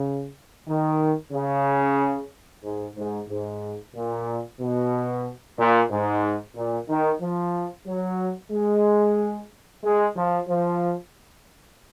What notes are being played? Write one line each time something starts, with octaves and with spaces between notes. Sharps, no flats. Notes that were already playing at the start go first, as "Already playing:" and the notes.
Already playing: C#3
D#3
C#3
G#2
G#2
G#2
A#2
B2
A#2
G#2
A#2
D#3
F3
F#3
G#3
G#3
F3
F3